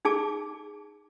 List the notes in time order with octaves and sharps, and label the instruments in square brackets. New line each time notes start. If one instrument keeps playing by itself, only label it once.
[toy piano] D#4 G#4 A5 D6